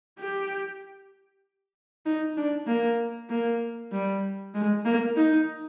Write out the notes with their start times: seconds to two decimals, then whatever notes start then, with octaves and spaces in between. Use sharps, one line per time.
0.19 G4
2.06 D#4
2.37 D4
2.67 A#3
3.29 A#3
3.92 G3
4.54 G#3
4.85 A#3
5.16 D#4